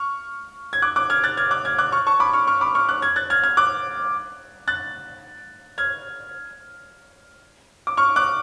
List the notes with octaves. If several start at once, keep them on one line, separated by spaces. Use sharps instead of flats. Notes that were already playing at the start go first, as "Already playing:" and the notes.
Already playing: C#6 F6
G#6
D6 F#6
D6 F#6
F6 G#6
F#6 A6
F6 G#6
D6 F#6
F6 G#6
D6 F#6
C#6 F6
A5 C#6
B5 D6
C#6 F6
C#6 F6
B5 D6
C#6 F6
D6 F#6
F6 G#6
F#6 A6
F6 G#6
F6 G#6
D6 F#6
F#6 A6
F6 G#6
D6
C#6 F6
D6 F#6